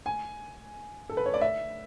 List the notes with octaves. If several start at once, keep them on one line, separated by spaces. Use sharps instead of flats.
G#5
A4
B4
C#5
D5
E5